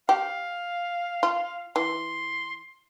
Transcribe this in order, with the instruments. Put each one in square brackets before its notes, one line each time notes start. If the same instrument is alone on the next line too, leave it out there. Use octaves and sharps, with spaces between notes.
[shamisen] G4 [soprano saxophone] F5
[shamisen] F4
[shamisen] E3 [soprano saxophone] C6